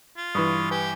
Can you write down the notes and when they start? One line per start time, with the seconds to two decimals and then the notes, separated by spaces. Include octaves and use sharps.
0.17 F4
0.35 G2 E3 B5 C#6 D#6
0.71 G4 B4 G#5